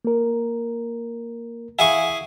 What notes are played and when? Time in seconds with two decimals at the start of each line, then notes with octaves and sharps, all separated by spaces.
0.05 A#3 A#4
1.79 E4 G#4 F5 F#5 G#5 C#6